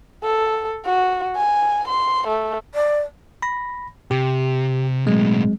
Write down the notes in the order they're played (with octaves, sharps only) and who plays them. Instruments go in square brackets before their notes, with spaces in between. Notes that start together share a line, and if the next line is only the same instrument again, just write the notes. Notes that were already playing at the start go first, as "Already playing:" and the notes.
[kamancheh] A4
F#4
G#5
C6
A3
[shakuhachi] D5
[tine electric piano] B5 A#6
[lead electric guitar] C3 [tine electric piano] G4
[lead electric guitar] B1 A2 [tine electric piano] F#3 G#3 C4